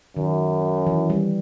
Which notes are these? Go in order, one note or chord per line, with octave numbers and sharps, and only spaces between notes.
F#2 D#3
E3
G3